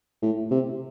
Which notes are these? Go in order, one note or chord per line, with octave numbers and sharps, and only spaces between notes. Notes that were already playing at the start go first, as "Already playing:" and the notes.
A2
C3